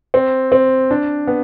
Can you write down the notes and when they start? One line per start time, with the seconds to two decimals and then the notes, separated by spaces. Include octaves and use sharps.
0.14 C4
0.52 C4
0.91 D4
1.27 B3